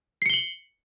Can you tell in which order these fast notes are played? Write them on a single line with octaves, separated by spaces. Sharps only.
C7 C#7 G7 F#7